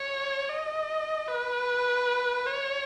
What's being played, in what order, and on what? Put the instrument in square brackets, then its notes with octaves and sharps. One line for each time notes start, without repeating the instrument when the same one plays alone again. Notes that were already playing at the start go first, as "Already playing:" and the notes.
Already playing: [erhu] C#5
D#5
B4
C#5